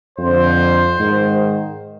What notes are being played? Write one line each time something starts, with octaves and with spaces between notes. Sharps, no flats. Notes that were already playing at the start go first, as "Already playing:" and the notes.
F2 D3 C5
G#2 D#3